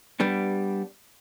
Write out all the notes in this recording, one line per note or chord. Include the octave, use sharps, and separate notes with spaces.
G3 B3 D4